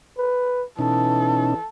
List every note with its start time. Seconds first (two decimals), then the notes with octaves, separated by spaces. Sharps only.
0.18 B4
0.79 B2 E3 C#4 D#4 A4